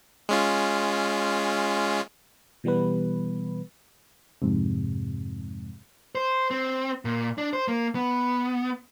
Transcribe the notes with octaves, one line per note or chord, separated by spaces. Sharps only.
G#3 C#4 F4
B2 E3 G3 B3 B4
F2 G#2 C3
C5
C4
A#2
D4
C5
A#3
B3